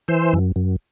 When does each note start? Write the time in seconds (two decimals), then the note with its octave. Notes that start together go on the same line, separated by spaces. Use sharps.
0.08 E3 C5
0.33 F#2
0.56 F#2